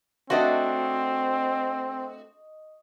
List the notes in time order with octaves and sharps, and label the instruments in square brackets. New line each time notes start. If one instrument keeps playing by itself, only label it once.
[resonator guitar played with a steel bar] A3 D4 F#4 [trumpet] C4 [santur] D#5 C#6